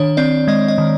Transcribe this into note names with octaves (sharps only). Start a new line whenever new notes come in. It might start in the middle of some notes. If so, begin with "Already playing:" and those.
Already playing: D#3 D4 C#5
C4 D5
G#3 D#5
D#5
D#3